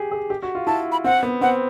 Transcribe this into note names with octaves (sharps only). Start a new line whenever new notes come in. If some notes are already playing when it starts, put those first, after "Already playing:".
Already playing: G4 G#4
G#4
G4
F#4
F4
E4 A5
B5
C4 F#5
B3
C4 F#5